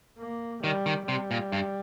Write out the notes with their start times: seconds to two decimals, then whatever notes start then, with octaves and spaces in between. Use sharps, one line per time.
0.19 A#3
0.64 D#3 G3
0.86 D#3
1.08 C3 G3
1.31 A#2
1.52 G2